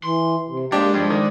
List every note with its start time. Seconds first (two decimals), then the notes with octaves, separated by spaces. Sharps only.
0.04 E3 C6
0.49 C3
0.72 G#3 A#3 D4 G4 G5
0.94 G2 F3 G#3 D5
1.10 D#3